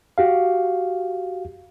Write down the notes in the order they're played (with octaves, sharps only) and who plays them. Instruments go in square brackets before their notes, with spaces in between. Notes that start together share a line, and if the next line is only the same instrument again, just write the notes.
[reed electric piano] F#4 G4 F5